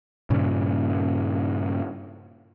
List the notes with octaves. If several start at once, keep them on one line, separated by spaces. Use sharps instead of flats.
G2 A#2 C#3